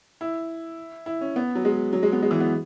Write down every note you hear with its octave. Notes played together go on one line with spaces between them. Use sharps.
E4
E4
C#4
B3
F#3
G#3
F#3
G#3
B3
G#3
E3
B3